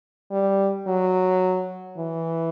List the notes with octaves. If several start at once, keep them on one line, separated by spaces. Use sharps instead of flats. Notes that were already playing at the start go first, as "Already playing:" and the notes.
G3
F#3
E3